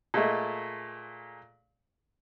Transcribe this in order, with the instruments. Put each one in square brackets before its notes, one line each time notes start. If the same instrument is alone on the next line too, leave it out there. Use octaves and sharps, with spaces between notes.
[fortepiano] A#2 G#3 A3